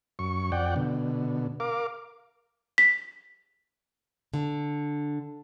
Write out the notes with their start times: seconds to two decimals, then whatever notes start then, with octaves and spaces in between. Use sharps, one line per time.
0.19 F#2 C#6
0.52 F2 D5 F#5 G5
0.76 B2 D3
1.60 A#4 F5 D6
2.78 B6
4.34 D3